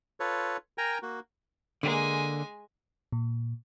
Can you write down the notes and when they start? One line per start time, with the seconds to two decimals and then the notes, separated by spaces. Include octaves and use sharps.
0.20 F4 A4 B4 C#5
0.78 A#4 G5 G#5 A#5
1.02 A#3 F#4
1.83 D3 G#3 A#3 G#5
3.12 A#2